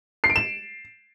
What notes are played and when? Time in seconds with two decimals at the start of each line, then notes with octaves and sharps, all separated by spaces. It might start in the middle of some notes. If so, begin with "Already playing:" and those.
0.24 C7
0.30 D7
0.36 E7